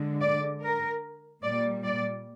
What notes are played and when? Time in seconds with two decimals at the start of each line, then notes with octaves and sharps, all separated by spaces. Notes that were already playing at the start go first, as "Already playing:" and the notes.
Already playing: D3 G#3
0.21 D5
0.62 A#4
1.42 A#2 G3 D5
1.84 D5